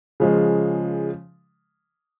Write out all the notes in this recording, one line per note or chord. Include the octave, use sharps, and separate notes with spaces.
C#3 F3 G#3